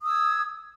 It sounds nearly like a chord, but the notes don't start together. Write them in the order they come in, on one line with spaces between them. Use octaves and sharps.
D#6 E6 G#6